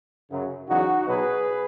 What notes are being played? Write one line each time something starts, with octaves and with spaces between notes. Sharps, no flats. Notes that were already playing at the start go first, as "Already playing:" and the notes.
F#2 C#3 F#3
E2 C#3 F#3 D#4 F#4
B2 F#3 B3 G#4 B4